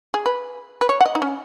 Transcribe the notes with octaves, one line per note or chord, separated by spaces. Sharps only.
G#4
B4
B4
C#5
F#5
D#5
D#4
C#4